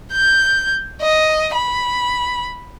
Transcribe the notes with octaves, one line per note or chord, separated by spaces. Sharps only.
G6
D#5
B5